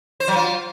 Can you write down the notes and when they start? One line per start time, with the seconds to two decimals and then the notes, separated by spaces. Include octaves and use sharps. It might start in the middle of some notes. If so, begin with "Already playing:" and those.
0.20 C5
0.28 F#3
0.36 F4